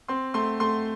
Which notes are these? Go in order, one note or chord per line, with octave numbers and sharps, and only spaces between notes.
C4 C6
A3 C6
A3 C6